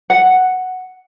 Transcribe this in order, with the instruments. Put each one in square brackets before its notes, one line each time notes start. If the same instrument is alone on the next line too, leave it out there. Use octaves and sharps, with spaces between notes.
[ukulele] F#5